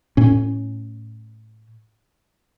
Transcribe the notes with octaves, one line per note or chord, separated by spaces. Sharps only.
A2 C#4